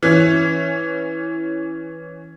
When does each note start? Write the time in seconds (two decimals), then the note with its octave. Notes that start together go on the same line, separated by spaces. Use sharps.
0.03 E3 C#4